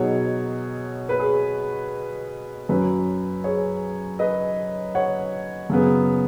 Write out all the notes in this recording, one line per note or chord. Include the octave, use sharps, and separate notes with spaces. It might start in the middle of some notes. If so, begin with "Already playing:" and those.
Already playing: B2 F#3 D#4 G#4 C#5
B4
G#4
F#2 F#3 C#4 B4
G#4 C#5
B4 D#5
C#5 F#5
F#2 C#3 B3